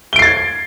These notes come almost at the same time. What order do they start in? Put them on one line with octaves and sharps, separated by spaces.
G7 D7 C7 A6 G#6